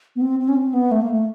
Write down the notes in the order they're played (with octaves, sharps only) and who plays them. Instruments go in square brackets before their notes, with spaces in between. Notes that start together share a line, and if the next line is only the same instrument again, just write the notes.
[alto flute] B3
C4
C4
C#4
C4
B3
A3
A#3
A3